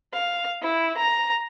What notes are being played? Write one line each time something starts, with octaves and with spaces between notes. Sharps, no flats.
F5
E4
A#5